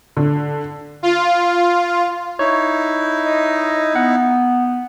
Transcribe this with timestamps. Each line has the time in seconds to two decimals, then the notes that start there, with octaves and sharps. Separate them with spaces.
0.17 D3
1.03 F4
2.39 D#4 E4 C#5
3.26 D#5
3.95 B3 F#5